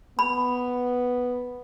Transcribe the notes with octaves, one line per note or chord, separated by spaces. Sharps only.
B3 B5